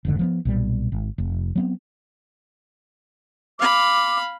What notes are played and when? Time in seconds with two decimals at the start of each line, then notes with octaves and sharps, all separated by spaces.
0.05 F1 G#2 D3
0.19 F3 A#3 B3
0.45 B1 A#2 G3
0.92 G#1
1.18 F1
1.56 F#3 B3 C4
3.59 F5 B5 D6